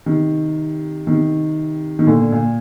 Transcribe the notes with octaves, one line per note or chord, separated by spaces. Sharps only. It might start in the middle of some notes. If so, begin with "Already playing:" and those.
C3 D#3
C3 D#3
D#3
A#2 D3
A#2